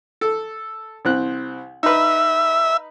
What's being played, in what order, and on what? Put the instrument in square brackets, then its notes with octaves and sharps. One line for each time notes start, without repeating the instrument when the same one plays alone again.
[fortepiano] A4
C2 C4 F#6
[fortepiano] D#4 B4 [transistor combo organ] E5